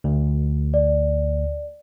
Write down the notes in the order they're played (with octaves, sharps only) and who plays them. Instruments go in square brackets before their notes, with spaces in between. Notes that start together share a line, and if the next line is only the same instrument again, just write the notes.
[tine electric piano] D2
[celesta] D5